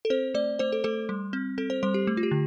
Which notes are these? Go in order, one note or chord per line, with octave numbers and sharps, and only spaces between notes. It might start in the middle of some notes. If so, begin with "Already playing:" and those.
A4
C4 C5
A3 D5
A3 C5
A4
A3 A4
G3
C4
C4 A4
C5
G3 C5
G4
A3
F4
G4
D3